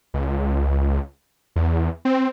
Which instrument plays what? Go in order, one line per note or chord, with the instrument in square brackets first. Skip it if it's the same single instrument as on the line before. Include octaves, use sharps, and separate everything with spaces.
[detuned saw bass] C#2
E2
C4